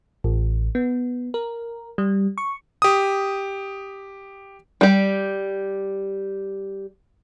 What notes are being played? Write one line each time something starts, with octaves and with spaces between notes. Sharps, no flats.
A1
B3
A#4
G3
C#6
G4 D#6
G3 G4